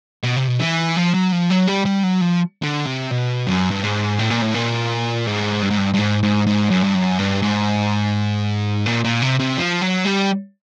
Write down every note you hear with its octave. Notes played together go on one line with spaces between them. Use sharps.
B2
C3
B2
E3
F3
F#3
F3
F#3
G3
G3
F#3
F3
D3
C3
B2
F#2
G2
G#2
A2
A#2
A2
A#2
G#2
G2
G#2
G2
G2
G#2
G#2
G#2
F#2
G2
F#2
G2
G#2
A#2
A#2
C3
C3
F3
F#3
G3